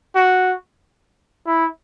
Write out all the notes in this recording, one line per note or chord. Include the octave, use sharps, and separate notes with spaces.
F#4
E4